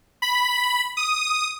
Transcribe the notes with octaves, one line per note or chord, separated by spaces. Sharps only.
B5
D#6